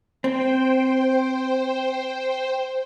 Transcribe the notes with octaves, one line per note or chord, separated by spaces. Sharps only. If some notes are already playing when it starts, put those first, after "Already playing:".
C4 C5 G5